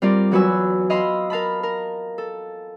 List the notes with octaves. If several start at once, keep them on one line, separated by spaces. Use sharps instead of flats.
G3 C4 F4 A#4 D5
E2 F#3 F#4 B4 G#5 E6
D#5 F5 B5 C6 E6
A#4 F5 A5 B5
A#4
A4